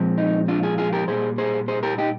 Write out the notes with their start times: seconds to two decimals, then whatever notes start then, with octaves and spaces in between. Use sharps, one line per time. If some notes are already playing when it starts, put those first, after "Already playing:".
Already playing: A#2 F3 G#3 C4
0.18 D#4
0.48 D4 F4
0.63 F4 G#4
0.78 F4 G#4
0.93 G4 A#4
1.08 A#2 G3 A#3 G#4 C5
1.38 G#4 C5
1.68 G#4 C5
1.83 G4 A#4
1.98 D#4 G4